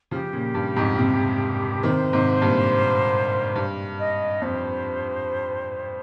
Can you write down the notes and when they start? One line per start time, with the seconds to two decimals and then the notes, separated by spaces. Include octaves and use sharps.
0.11 C#3 F3 G4
0.33 A#2 C#3
0.54 G2
0.76 F2 G#2
0.98 G#2 C3
1.83 C3 D#3 C5
2.13 G#2 C3
2.41 G2 A#2
3.56 G2
3.99 D#5
4.41 F2 C5